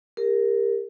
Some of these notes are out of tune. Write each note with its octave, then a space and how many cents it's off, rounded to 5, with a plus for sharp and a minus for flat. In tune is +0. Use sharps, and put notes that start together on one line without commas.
G4 +35 A#4 +0